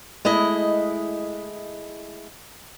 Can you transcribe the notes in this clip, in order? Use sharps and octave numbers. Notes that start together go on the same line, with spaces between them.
G#3 A3 E4 D#5